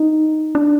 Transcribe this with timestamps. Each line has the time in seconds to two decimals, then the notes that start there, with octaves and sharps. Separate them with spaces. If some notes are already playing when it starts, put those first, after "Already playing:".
Already playing: D#4
0.55 D4